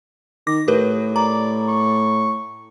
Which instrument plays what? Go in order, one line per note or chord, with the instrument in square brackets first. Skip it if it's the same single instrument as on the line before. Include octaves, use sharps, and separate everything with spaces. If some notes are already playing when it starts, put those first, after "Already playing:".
[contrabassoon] D#3 [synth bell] D6 A#6
[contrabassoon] A2 [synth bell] G4 A#4 B4
[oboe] D5 [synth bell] A#5
[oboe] C#6